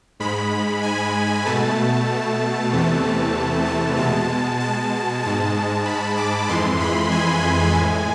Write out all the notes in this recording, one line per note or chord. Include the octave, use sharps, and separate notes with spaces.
G#2 G#3 B5
G#5
B2 A3 A5
E2 C3 E3 A3
A5
B2 G#3 A5
A5
G#2 G#3 A5
B5
D6
F2 E3 G#3 C6
B5
G#5
A2 G#3